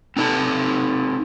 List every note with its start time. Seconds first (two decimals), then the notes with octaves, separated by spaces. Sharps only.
0.17 C4 D#4 A4 A5